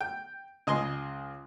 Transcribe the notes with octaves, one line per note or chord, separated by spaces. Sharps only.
G5
C#2 D#5 G#5 C6